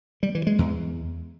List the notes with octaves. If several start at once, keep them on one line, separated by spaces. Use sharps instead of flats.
G3
E3
G#3
E2